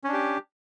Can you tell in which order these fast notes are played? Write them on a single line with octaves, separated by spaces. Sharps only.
C#4 D4 G4